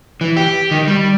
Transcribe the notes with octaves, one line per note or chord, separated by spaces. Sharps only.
E3
G4
D#3
G3